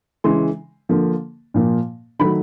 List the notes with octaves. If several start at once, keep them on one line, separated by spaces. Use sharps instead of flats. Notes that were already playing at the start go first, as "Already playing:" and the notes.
C#3 E3 G#3 C6
D3 F3 A#3
A#2 F3 A#3
D#3 F#3 A3 B5